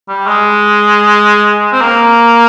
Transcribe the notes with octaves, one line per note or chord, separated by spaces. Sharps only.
G3
G#3
C4
A#3